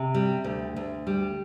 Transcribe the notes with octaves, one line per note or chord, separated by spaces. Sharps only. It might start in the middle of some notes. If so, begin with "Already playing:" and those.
Already playing: C3
G3
D2
D2
G3